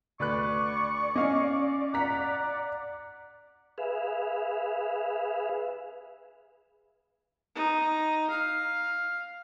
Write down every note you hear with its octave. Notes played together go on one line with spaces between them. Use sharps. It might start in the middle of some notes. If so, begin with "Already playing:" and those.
D2 B4 D5 C#6 F#6
C#4 D#5 F5 G#5
F#5 A#5 B6
G#4 B4 E5 F5
D#4
F5